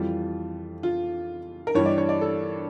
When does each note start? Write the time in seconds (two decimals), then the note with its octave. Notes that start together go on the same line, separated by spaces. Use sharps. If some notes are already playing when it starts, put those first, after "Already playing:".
Already playing: F2 E3 G3 F4
0.83 F4
1.67 A#4
1.75 G2 E3 G3 C#5
1.86 D5
1.98 C#5
2.09 D5
2.21 A4